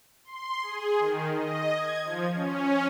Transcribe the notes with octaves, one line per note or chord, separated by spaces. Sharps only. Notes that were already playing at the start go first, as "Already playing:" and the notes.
C6
G#4
D#3
D#5
G#6
F3
C#4